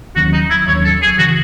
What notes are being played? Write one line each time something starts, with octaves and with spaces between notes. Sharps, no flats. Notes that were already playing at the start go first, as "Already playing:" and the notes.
D#2 D#3 F#3 C#4 F#4
D#4
E4
D#2 D#3 F#3 C#4 C#5
A4
G#4
C#3 E3 F#4